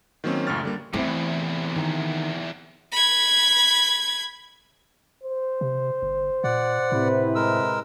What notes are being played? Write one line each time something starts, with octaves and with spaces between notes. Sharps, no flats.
D#3 F#3 A#3 C4 C#4
C#2 F#2 A2 C#6 F6 A6
D3 G3 A#3
E2 C3 E3 A3 C4 E4
D#3
B5 G#6
C5
C3
G1
A#2 D5 F#5
A2 C3 E4 B4
G#3 A#4 E6